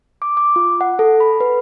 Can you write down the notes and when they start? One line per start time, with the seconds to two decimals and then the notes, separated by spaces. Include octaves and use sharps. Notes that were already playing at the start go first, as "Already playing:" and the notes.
0.22 D6
0.37 D6
0.56 F4
0.81 F#5
0.99 A4
1.20 B5
1.40 B4